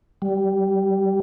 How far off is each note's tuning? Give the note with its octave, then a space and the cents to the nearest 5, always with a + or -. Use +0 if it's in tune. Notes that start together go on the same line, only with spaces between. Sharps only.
G3 -15